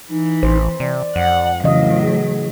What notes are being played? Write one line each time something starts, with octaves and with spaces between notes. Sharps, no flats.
E3 D#4
A1 C5
C3 D5
F2 F#5
A2 C#3 E3 F#3 D#5 F5
G#4